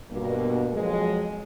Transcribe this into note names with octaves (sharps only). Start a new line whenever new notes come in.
G2 B2 A#3
F2 F3 F#3 G#3